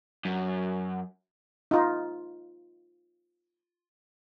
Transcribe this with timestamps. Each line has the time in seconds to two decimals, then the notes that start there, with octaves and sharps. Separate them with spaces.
0.25 F#2
1.71 D#4 F4